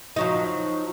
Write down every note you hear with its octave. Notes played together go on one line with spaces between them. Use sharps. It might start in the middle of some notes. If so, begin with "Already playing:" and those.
F3 F#3 D#4